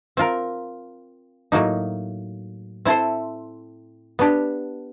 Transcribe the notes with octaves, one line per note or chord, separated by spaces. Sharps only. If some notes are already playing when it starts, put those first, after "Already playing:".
C4 F4 A#4
A2 F#3 A#3 D#4
C4 E4 A4 C5
B3 D4 G4